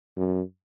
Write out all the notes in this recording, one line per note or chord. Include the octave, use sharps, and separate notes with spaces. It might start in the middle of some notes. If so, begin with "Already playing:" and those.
F#2